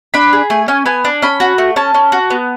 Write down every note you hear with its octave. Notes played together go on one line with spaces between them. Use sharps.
D4 B5
G#4
A3 G#5
C#4 G#5
B3 G#5
D4
C#4 B5
F#4
A3
C#4 A5
C#4
F#4
B3